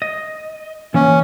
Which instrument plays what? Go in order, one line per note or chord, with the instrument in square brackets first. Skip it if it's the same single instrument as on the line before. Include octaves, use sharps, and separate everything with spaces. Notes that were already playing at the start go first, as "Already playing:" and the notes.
[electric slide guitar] D#5
[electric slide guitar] E3 A#3 [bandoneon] C#4